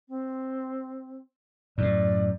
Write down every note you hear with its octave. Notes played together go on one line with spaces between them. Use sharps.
C4
F#2 A2 D5